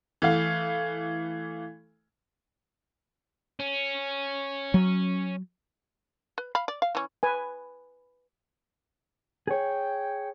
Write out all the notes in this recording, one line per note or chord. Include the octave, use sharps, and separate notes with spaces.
E3 A3 F5
C#4
F#3
B4
F5 B5
D5
F5
E3 C#4
B4 G#5
G#4 C#5 G5